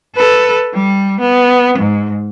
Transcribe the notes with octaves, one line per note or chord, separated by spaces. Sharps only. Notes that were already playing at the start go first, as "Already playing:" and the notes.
A4 B4
G3
B3
G#2